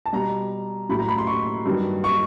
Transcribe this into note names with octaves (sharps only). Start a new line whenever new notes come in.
A5
B2 G3 A#5
A2 F#3 B5
A#5
B5
C6
C#6
G2 D#3 F#3
C#6